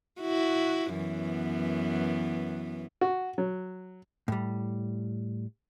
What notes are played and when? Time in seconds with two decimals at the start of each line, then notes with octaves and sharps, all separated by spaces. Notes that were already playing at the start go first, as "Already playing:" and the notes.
0.21 E4 F#4
0.96 F#2 E3 B3
3.01 F#4
3.38 F#3
4.28 A2 G3